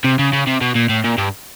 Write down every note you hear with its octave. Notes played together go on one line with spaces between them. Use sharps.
C3
C#3
C#3
C3
B2
A#2
A2
A#2
G2